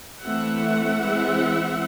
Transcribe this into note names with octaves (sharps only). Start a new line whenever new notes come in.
E3 A3 C4 E5 F#5
E3 G#3 C4